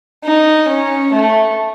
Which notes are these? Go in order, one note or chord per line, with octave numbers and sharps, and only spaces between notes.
D#4
C#4
A3